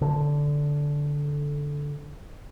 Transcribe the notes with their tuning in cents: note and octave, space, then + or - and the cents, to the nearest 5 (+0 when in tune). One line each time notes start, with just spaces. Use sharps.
D3 -10